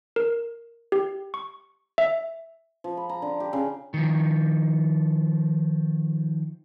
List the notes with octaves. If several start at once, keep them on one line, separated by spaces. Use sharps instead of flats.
A#4
G4
C#6
E5
F3
B5
A#5
D3
G4
C#3
D#3 F3